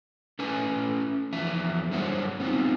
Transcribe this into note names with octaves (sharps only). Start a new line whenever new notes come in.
A3 C#4 B4 G#5
E2 F3 E5
F#2 D3 G3 C5 C#5 F#5
B3 C4 D#4 F4